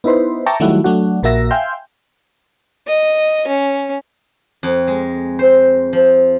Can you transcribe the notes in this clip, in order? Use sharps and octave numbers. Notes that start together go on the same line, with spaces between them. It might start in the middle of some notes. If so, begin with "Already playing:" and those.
B3 D#4 E4 B4 C5
E5 G5 A5 A#5 C#6 D6
D#3 F#3 G3 A3 E4 F#4
F#3 A3 D4 F#4
A#1 A#2 A#3 F#4 E5 A#6
E5 F5 G5 G#5 C6 G6
D#5
C#4
F2
G#3
C5
F3